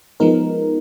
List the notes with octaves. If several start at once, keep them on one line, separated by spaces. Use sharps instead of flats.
F3 G#3 B3 D#4 A#4